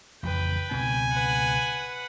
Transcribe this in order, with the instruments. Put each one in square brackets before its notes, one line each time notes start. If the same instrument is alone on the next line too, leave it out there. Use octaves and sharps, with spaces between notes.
[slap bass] A1 F2 C#3 [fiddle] B4 G5
[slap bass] C#2 B2 C4 [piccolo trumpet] G#5
[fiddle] B4 F#5